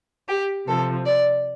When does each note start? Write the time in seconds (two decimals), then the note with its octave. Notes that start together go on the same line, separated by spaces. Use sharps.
0.29 G4
0.67 C3 F3 A4
1.06 D5